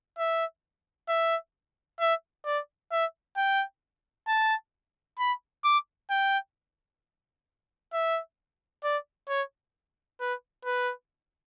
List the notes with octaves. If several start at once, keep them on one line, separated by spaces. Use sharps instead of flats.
E5
E5
E5
D5
E5
G5
A5
B5
D6
G5
E5
D5
C#5
B4
B4